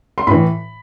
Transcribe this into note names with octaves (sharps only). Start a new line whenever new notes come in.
C6
A2 E3 B5